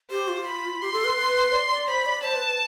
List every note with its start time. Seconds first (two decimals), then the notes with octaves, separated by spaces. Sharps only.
0.10 G4 C5
0.28 F4
0.46 B5
0.81 G4 C6
0.93 A4
1.05 B4
1.17 B4
1.52 D5
1.70 D5
1.88 C5 B5
2.06 D5
2.23 C5 A5
2.35 B4